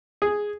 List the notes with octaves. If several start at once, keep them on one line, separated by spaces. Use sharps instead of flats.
G#4